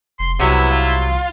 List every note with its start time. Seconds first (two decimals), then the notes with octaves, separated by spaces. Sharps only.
0.19 F1 C6
0.40 C2 C3 F#3 B3 E4
0.71 F4